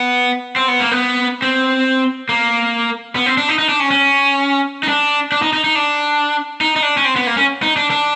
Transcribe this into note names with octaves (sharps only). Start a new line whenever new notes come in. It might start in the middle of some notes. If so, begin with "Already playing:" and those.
Already playing: B3
C4
B3
A#3
B3
C4
A#3
B3
C4
D4
D#4
D#4
D4
C#4
C#4
D#4
D4
D4
D#4
D#4
D#4
D4
D#4
D#4
D4
C#4
C4
B3
A#3
C#4
D#4
D4
D4